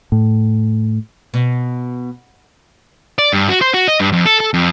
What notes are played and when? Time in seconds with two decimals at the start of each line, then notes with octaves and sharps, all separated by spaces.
0.12 A2
1.34 B2
3.19 D5
3.33 G2
3.49 F#4
3.61 C5
3.74 F#4
3.88 D#5
4.00 G2
4.13 F2
4.26 A4
4.40 A4
4.54 F2